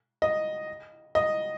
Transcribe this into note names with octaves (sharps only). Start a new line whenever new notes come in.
D#5
D#5